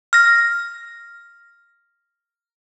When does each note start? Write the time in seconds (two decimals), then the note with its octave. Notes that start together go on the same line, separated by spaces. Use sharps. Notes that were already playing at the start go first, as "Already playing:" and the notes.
0.13 F6 A#6